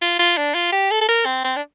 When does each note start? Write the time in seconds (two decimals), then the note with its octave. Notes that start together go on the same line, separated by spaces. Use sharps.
0.01 F4
0.19 F4
0.37 D4
0.54 F4
0.72 G4
0.91 A4
1.01 A4
1.09 A#4
1.25 C4
1.44 C4
1.56 D4